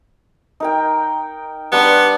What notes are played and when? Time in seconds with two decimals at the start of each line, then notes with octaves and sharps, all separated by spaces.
0.60 D#4 A#4 G5
1.72 G3 B3 D4 C6